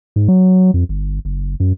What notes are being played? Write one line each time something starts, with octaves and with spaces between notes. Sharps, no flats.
G#2
F#3
F2
G1
F#1
F#2